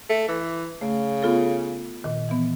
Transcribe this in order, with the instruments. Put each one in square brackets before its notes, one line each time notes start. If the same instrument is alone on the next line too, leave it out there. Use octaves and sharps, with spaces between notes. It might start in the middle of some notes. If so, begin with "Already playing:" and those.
[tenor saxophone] A3
E3
[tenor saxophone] C#3 [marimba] A3
[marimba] B3 F4 A4
A#2 D#3
E3 B3